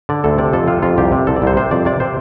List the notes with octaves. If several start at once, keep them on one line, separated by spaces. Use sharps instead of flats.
D3 D5
D2 A4
C3 D5
F2 A4
C3 F4
F2 F4
C2 G4
C3
C2 A4
D5
C2 C5
C3 C5
F2 D5
C3 D5
C3 C5